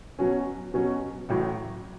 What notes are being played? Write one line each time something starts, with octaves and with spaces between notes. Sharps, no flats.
B2 F#3 C#4
B2 F#3 C#4
A1 A2 F#3